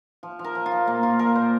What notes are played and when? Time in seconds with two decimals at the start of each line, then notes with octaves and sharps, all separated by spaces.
0.23 F3
0.39 F3
0.44 A#4
0.55 F3
0.66 F4
0.72 F3
0.87 A#2 A#3
1.03 A#2 F4
1.19 F3 A#4
1.35 A#2 C5